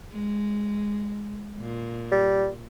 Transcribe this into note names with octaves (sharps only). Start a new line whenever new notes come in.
G#3
A#2
G3